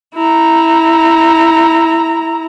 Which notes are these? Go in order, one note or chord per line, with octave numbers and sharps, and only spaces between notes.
E4 A#5